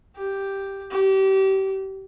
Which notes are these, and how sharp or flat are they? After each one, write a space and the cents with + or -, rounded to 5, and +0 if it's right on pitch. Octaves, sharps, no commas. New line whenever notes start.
G4 +0
G4 -30